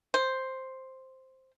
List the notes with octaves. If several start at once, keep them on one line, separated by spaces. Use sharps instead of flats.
C5